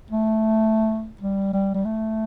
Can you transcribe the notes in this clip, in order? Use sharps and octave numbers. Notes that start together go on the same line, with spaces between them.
A3
G3
G3
G3
A3